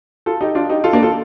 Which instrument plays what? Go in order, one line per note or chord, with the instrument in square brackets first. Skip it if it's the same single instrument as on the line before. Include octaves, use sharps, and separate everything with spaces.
[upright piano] F4 A4
D#4 G4
D4 F4
D#4 G4
F4 A4
A#3 D4
F4 A4